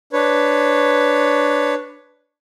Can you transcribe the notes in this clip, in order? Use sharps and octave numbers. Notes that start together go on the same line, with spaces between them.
D4 B4 C#5